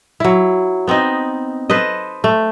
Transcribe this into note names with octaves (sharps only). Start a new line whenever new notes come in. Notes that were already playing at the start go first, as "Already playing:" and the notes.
F#3 E4
B3 C4 D#4 D#5
A4 B4 C5 D#5
A3